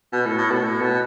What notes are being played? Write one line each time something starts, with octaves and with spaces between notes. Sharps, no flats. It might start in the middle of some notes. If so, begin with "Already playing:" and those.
B2
A2
A2
B2
A2
B2